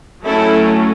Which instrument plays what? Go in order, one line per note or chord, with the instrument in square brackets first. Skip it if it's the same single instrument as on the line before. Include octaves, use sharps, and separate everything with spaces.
[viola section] F#3 A3 C#4 E4 A4